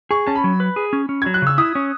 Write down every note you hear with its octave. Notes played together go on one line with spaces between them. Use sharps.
G#4 C#6
C#4 A5
B5
F#3
B4
G#4
C#4
C#4
F#3 G#6
F#6
C#3 E6
E4 D#6
C#4